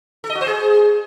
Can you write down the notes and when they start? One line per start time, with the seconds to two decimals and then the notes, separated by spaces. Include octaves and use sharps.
0.24 A4
0.30 D#5
0.35 F#4
0.41 C5
0.47 G#4